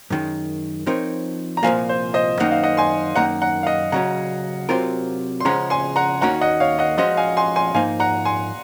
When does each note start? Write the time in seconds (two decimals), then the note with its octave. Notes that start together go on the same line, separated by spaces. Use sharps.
0.10 F#2 D#3 G#3
0.86 F3 C4 D#4 A#4 C#5
1.57 A#5
1.63 C2 A#2 F3 A#3 F5 G#5
1.89 C5
2.14 C5 D#5
2.39 F#2 D#3 A#3 D#4 F#5
2.51 F5
2.63 D#5 F#5
2.77 G#5 C6
3.15 F#2 D#3 A#3 D#4 F#5 A#5
3.42 F#5 A#5
3.63 F5
3.67 D#5 F#5
3.92 C#3 F#3 C#4 F#5 A#5
4.69 C3 F#3 C4 F4 A#4
5.40 C6
5.45 C#3 F3 G#3 C#4 F#5 A#5
5.70 G#5 C6
5.96 F#5 A#5
6.21 D#2 D#3 A#3 C#4 F#4 F#5 A#5
6.41 D#5 F#5
6.60 C#5 F5
6.79 D#5 F#5
6.98 F3 G#3 C#4 F#4 C5 D#5 F#5
7.17 F5 G#5
7.37 G#5 C6
7.56 G#5 C6
7.74 G#2 F3 A#3 D#4 F5 G#5
8.00 F#5 A#5
8.25 G#5 C6